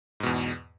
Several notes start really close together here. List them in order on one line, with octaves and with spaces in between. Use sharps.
G#2 B2 E2